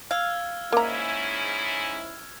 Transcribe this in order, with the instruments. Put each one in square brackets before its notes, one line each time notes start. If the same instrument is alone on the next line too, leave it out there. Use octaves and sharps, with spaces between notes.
[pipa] F5 [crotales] E6 F6 G#6
[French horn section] G#2 C#4 E4 [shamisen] A#3 A#5